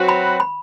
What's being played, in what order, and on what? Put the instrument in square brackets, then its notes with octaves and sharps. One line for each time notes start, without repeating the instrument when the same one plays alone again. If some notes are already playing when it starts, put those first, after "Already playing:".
Already playing: [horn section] F#3 C4 F#4 B4
[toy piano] B5
B5